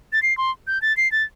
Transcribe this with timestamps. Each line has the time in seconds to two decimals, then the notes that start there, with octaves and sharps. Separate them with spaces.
0.13 A6
0.23 C7
0.38 C6
0.67 G6
0.82 A6
0.97 C7
1.12 A6